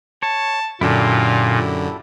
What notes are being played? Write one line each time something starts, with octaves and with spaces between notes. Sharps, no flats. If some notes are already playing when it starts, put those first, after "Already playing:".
C#5 A5
F#2 A#2 D3 E4 F4 G4 A4